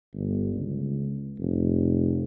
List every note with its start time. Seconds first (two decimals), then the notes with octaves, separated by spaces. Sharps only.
0.14 G1
0.54 C#2
1.39 F1